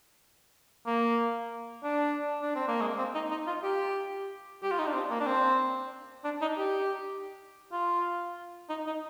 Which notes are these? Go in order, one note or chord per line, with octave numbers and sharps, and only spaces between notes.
A#3
D4
D4
C4
A#3
G#3
C4
D#4
D#4
F4
G4
G4
F4
D#4
D4
C4
A#3
D4
C4
D4
D#4
G4
F4
D#4
D#4